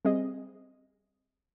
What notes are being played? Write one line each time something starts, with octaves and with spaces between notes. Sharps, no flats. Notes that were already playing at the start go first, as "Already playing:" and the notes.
G3 C4 G#4 D#5